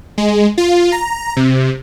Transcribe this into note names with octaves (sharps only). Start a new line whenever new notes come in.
G#3
F4
A#5
C3